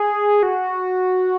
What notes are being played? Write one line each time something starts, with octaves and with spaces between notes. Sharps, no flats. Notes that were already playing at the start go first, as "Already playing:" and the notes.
Already playing: G#4
F#4